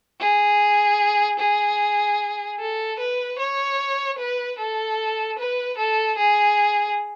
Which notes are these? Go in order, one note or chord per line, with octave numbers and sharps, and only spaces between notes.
G#4
G#4
A4
B4
C#5
B4
A4
B4
A4
G#4